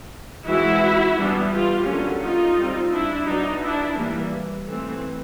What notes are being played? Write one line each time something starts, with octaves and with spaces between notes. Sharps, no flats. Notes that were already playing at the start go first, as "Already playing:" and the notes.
E3 G#3 C4 E4 F#4
E3 G3 B3 D4
F4 G4
D3 F#3 A#3 C#4
D#4 F4
G3 C4
D4 E4
F#3 B3 D4 D#4
D4 E4
E3 G3 A#3
E3 A3 C4